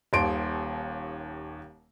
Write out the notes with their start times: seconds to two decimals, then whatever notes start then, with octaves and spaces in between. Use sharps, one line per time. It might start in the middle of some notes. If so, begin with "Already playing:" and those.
0.13 D#1 D#2 C6 D7